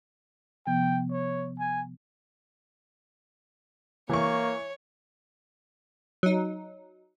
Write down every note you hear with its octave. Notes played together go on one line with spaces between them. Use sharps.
C3 F3 B3 G5
C#5
G#5
E3 A#3 C#5 C#6
F#3 D#4